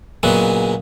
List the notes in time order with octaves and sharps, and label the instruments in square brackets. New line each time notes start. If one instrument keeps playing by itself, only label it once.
[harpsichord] A#2 C#3 F#3 G#3 B3